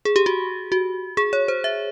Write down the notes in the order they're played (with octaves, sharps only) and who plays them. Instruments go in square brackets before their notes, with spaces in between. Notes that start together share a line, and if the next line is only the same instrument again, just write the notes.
[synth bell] G#4
G4
F#4
F#4
G#4
C#5
C5
E5